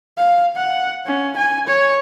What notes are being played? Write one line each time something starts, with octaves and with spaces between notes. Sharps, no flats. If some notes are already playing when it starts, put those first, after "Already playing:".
F5
F#5
C#4
G#5
C#5